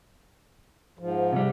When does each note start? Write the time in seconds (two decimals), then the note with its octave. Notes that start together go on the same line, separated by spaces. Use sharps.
0.99 G#2 F3
1.33 C3 G3